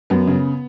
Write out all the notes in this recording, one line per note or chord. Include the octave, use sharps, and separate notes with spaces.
F#2 B3
C#3